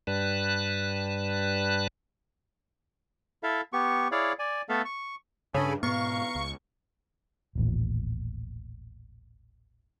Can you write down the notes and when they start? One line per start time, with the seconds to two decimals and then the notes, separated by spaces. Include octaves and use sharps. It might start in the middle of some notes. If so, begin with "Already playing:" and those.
0.07 G2 G3 B4 A5 F#6
3.43 E4 A4 E5 F5
3.73 B3 G4 C#6
4.12 E4 G#4 C#5 D5 F5
4.39 D5 G#5
4.69 A3 B3 A4 E5 F5
4.85 C#6
5.54 G2 C#3 D4 A4 G#5 B5
5.83 G#2 B2 B3 F5 A#5 C#6
6.35 C#2
7.55 D#1 A1 A#2